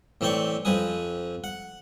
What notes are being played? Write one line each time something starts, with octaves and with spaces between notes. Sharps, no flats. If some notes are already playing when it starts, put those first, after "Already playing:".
A2 E3 C4 D5 G5 C#6
F2 C4 B4 G#5 D#6
F#5